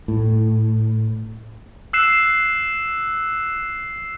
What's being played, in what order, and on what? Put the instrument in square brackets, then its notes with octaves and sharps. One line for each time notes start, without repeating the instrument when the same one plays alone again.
[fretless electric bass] A2
[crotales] E6 F#6 C7 E7